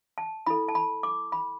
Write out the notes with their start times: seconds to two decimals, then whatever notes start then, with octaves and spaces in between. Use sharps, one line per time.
0.18 A5
0.47 E4 A4 B5
0.68 A5
0.75 B5
1.03 D6
1.32 B5